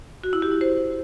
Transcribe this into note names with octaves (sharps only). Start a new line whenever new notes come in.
F#4
E4
G4
E4
C5